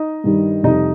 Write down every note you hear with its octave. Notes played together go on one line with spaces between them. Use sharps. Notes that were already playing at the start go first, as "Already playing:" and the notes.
Already playing: D#4 D#5
G2 D#3 G3
F2 C3 G3 D#4 D#5